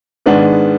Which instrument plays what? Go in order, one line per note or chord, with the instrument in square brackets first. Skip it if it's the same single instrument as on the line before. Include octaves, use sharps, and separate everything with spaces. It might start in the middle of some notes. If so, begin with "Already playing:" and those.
[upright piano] G#2 D#3 G#3 B3 D4